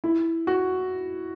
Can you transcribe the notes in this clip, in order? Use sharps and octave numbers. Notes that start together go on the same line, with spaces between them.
E4
F#4